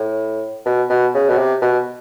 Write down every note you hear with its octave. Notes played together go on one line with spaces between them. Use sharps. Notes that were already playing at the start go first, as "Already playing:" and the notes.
Already playing: A2
B2
B2
C#3
B2
C3
B2